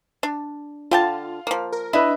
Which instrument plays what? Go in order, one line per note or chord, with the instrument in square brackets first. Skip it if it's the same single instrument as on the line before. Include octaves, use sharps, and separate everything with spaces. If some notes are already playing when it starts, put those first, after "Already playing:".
[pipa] D4
[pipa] D3 G5 A5 [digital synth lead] F4 [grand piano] F5
[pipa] F3 A#3
[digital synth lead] A#4
[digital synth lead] D4 [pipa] E4 [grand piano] B4 D#5 E5